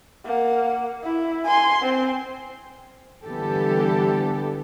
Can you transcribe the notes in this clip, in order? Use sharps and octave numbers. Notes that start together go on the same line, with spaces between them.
A#3 F#5
E4
G#5 C6
C4
D3 E3 G3 B3 G4 A4